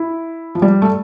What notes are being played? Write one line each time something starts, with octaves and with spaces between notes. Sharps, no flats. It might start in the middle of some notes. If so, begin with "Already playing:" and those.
Already playing: E4
F3
G3
A3